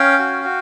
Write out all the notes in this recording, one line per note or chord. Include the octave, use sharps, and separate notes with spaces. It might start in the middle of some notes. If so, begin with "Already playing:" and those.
Already playing: C#4 F5 G5
F#4
F#4